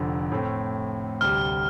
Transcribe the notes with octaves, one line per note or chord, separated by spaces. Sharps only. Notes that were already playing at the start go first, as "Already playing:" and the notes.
Already playing: F1 F2 D3
A2 A3 C4
D2 C3 G3 F6